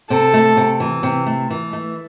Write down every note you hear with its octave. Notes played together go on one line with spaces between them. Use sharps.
C3 A4
A3
C3
E3
C3
A3
E3
A3